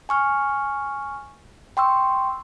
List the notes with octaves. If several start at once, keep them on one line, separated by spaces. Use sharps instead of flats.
G#5 C#6 F6
G5 C6 C#6 E6